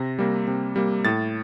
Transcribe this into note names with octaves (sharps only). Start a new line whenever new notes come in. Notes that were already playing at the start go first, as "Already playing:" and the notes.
Already playing: C3 A#6
G3 A#3
C3
G3 A#3
A2 A6